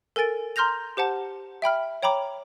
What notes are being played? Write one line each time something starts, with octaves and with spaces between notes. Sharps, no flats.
A4 A#4 G#5 A6 D7
A#5 C6 F6 G6 A#6 F7
G4 C5 F#5 A5
E5 G5 B5 F6
C#5 G5 A#5 B5 D6